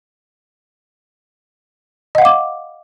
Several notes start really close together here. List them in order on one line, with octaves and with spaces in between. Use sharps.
D#5 F#5 F5 D6